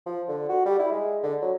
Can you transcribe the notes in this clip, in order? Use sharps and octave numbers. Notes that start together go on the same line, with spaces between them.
F3
D3
F#4
G3
E4
G#3
D3
F#3